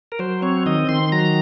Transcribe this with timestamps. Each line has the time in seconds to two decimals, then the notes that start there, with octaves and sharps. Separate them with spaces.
0.12 A#4
0.19 F#3 C5
0.42 C4 C#5
0.66 D#3 D#5
0.89 D#3 C6
1.12 F#3 A#5